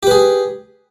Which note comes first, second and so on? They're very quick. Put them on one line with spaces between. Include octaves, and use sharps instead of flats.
G4 B4 G#4